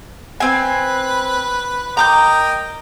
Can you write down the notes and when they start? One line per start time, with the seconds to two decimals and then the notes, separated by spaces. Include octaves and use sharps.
0.40 C4 B4 G#5
1.97 A#4 D#5 G5 A#5 D6 G6